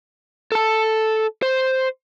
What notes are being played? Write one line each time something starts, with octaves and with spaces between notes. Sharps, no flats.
A4 A5
C5